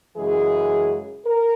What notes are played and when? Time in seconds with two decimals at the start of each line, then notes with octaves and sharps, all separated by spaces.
0.16 F#2 C#3 E3 G#3 G#4
1.25 A#4